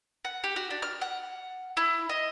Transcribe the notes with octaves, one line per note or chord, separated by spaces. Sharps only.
F#5
G4
F#4
D4
F6
F#5
E4
D#5